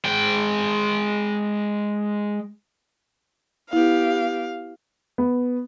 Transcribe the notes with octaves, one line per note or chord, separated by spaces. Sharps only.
G#3 G5
B3 E4 G4 F5
B3